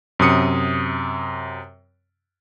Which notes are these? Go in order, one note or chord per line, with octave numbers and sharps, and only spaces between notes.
F#2 C3 D#6 C#7